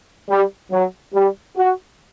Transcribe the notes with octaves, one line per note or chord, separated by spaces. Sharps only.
G3
F#3
G3
F#4